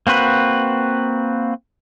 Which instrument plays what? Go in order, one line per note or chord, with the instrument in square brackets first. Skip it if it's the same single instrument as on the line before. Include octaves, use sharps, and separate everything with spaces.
[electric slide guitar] A#3 C4 F#4 B4